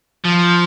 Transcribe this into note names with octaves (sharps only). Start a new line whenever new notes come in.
F3